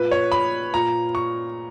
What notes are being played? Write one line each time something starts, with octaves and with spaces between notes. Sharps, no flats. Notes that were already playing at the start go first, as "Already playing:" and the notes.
Already playing: A#2 B4
C#5
B5
A#2 A#5
C#6